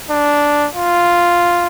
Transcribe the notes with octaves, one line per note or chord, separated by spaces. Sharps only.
D4
F4